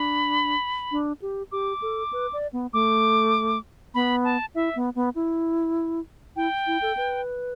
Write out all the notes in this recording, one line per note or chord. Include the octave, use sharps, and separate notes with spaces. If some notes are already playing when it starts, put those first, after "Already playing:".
Already playing: D4 B5
D4
G4
G4 D6
A4
B4
D5
B3
A3 D6
B3 B5
A5
E4 E5
B3
B3
E4
E4 G5
E4
A4
B4